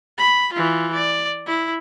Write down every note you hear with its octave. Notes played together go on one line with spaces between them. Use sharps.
B5
E3 F4
D5
E4